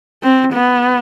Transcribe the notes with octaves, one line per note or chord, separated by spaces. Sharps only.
C4
B3